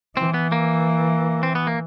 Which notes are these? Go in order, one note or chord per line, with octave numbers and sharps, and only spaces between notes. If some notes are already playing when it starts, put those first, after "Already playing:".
E3 C4
B3
A#3
C4
B3
A#3